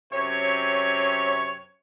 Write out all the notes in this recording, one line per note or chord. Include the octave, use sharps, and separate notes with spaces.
F#2 C3 C#5